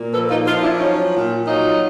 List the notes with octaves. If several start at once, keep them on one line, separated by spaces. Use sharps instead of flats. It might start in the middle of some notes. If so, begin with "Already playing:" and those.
Already playing: A#2
F3 A4 B4
D#4 F4
F3 D#4 F4
F4
D4 E4
F#3 C#4 D#4
A#2
F#3 D#4 F4